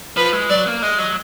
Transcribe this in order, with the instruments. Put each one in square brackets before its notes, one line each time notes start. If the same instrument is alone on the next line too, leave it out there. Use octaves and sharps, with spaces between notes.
[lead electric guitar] F3 [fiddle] B4
[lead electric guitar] G#3
[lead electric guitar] F#3 [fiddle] D5
[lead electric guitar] A#3
[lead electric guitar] G#3 [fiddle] D#5
[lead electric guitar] F#3